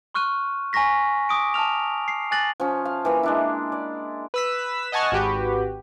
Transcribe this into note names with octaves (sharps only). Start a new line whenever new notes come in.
C6 C#6 F6 F#6 D#7
G#5 A#5 C#6 A#6 B6
D6 D#6 D7
A5 A#5 F6 F7
C7
G#5 D6 F#6 A6 A#6 F#7
F3 C#4
F5
E3 A#3
G#3 D4 E4
D5
B4 E6 B6
D#5 F#5 G#5 A5 C#6 F6
G#1 F#4 G4 B4